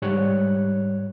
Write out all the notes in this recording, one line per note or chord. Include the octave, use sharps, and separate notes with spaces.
G#2 G3 C#5 F#6